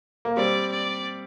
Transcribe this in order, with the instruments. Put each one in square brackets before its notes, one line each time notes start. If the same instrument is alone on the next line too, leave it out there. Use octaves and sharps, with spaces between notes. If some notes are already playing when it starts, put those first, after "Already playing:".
[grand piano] A#3
[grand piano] G3 C4 [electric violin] D5
[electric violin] D5